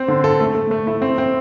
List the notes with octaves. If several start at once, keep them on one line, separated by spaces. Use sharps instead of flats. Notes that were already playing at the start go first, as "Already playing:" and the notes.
Already playing: C4 C5
D3
A4
A3
A3
A3
E4
C4
C4